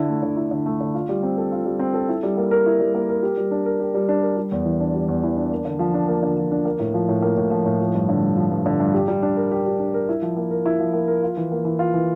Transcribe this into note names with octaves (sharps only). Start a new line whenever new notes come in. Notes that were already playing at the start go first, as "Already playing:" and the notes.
Already playing: D3 E4
A3
D3
E4
D3
A3
D3
F4
G3
C4
A4
F4
G3
C4
A4
E4
G3
A#3
A#4
E4
G3
A#3
A#4
G4
G3
D4
A#4
G4
G3
D4
A#4
G3
E2
E3
D4
G3
E2
E3
D4
A#3
D3
F3
D4
A#3
D3
F3
D4
A#3
A2
F3
A2
A#3
A2
F3
A2
F3
G2
D3
G2
F3
G2
D3
G2
G4
G3
D4
A#4
G4
G3
D4
A#4
E4
F3
A#3
A#4
E4
F3
A#3
A#4
F4
E3
A#3
E3
F4
E3